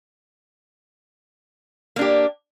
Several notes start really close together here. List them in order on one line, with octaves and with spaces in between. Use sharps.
A#3 D4 G4